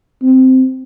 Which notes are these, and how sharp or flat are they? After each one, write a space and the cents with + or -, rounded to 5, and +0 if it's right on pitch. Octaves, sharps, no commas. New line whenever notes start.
C4 -10